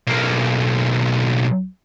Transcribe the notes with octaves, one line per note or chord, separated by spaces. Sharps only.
B1 A#3